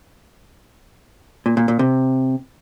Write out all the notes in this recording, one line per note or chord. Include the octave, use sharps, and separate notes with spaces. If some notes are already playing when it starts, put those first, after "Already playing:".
A#2
A#2
A#2
C3